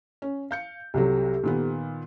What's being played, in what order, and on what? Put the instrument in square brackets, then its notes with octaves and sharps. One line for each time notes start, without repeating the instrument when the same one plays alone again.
[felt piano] C#4
F5 G6 C#7
[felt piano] C2 C3 F#3 [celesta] G4 A4
[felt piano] A#2 D#3 B3